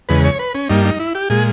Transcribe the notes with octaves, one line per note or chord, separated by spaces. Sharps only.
E2 C#3 G#3 B4
C#5
B4
C#4
G2 G3 A#3 D#4
D#4
E4
G4
A#2 G#3 G#4